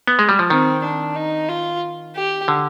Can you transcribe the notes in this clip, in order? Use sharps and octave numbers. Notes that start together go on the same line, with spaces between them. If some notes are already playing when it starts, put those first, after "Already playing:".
B3
G#3
G3
F3
D#3 C4
D4
D#4
F4
G4
D3